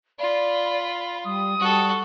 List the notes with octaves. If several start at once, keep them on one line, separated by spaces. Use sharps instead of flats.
F4 D5 B5
G3 D#6
G3 F#4 A4